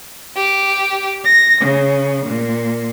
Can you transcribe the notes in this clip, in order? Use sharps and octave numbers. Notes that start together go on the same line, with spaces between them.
G4
A#6
C#3
A#2